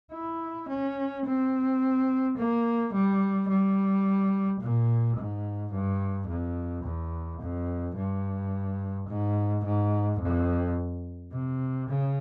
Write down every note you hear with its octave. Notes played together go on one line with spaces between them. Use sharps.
E4
C#4
C4
A#3
G3
G3
A#2
G#2
G2
F2
E2
F2
G2
G#2
G#2
F2
C3
C#3